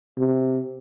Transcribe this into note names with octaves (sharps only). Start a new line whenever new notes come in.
C3